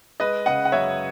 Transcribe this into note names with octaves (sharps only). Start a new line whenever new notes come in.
G#3 B4 D#5
C#3 D#5 F#5
F#5
F#2 C#5 E5